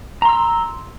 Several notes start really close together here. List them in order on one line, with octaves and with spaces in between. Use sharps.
A#5 C6 E6